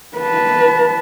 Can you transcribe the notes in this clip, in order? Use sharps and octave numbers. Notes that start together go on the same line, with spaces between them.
B4 A5